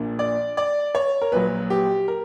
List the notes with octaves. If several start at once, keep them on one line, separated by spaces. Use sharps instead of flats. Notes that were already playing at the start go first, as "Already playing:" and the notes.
Already playing: A#1 A#2 A#3 D4
D5
D5
C#5
A#4
A#1 A#2 F#3 B4
G4
A#4